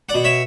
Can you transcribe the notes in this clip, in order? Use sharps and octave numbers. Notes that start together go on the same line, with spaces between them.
D5 F#5
B2
C#5 E5